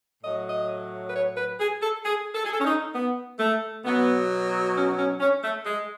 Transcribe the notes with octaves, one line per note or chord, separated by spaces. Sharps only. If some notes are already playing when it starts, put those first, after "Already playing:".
A2 F#3 D#5
D#5
B4
C#5
B4
G#4
A4
G#4
A4
G#4
A4
C#4
D#4
B3
A3
B2 F#3 B3
C#4
C#4
C#4
A3
G#3